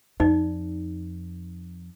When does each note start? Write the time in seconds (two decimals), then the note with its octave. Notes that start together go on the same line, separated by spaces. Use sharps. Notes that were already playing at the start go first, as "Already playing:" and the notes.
0.20 F2 D#4 D5